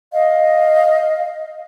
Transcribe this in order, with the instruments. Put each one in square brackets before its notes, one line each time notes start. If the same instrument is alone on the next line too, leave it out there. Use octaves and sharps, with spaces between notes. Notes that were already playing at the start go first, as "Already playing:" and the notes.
[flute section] D#5 F5